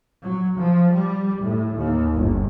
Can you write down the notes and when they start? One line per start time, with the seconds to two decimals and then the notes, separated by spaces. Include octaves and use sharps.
0.23 F#3
0.57 F3
0.91 G3
1.43 A2
1.76 D#2
2.14 G1